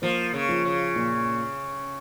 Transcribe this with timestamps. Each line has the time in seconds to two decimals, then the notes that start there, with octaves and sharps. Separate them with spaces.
0.02 F3 A#3
0.34 C#3
0.49 F3
0.65 C#3
0.96 A#2